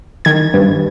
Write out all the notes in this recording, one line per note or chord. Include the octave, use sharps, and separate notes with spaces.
D#3 G#6
G2